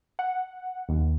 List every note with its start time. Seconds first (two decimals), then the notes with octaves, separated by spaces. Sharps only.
0.19 F#5
0.89 D#2